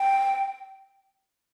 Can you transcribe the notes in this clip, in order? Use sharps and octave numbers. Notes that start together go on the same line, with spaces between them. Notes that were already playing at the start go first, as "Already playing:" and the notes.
Already playing: G5